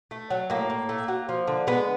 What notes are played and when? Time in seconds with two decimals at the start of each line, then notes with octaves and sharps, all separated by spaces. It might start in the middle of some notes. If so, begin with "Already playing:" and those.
0.11 A3
0.30 F#3
0.50 A2 A#3
0.70 A2
0.89 A3
1.08 F#3
1.29 F3
1.47 D3
1.67 G#3 B3